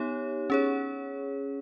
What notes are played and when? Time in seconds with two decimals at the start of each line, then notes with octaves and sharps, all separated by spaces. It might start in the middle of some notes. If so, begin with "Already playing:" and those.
Already playing: B3 D#4 G4 C#5
0.50 C#4 G#4 C#5